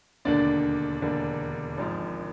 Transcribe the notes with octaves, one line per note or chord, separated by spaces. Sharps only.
E1 D#2 D3 D4 D5
E1 D#2 D3
G#1 G#2 F3